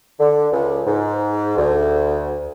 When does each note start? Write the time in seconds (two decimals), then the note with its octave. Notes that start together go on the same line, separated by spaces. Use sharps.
0.19 D3
0.52 C#2
0.86 G#2
1.57 D2